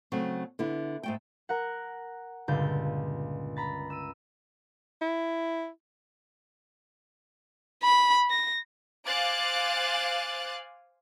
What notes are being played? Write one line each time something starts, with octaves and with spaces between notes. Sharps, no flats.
C#3 F#3 A3 C4
D3 B3 E4
G#2 A3 G5
A#4 F#5
C#2 G2 A#2 D3 G6 A6
A#5 B5 A6
E6 D#7
E4
B5
A#6
C5 F5 G#5 D6 F#6 A6